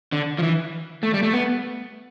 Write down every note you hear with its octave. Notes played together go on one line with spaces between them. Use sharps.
D3
F3
E3
A3
G3
A3
B3